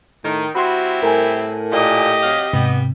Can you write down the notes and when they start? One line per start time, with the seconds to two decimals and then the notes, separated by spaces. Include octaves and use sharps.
0.24 A2 D#3
0.55 G3 C4 E4 F#4 B5 C6
1.03 A2 A#4 G#5
1.72 A#2 G4 D#5
2.22 C3 F#3 F5
2.53 G#2 C3 G3 B3